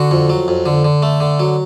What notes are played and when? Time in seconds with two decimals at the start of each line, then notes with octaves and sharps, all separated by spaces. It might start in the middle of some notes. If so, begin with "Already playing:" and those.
Already playing: D3 F#4
0.11 F2
0.30 F#3
0.48 F2
0.66 D3
0.84 D3
1.02 A3
1.20 D3
1.40 F#3